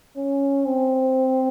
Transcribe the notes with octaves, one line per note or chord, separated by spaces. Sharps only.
C#4
C4